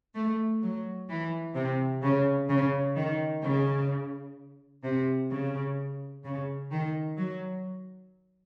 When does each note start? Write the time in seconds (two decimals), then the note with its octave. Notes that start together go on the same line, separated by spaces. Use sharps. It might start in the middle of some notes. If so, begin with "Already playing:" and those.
0.15 A3
0.62 F#3
1.09 E3
1.55 C3
2.03 C#3
2.49 C#3
2.96 D#3
3.43 C#3
4.83 C3
5.30 C#3
6.24 C#3
6.71 D#3
7.17 F#3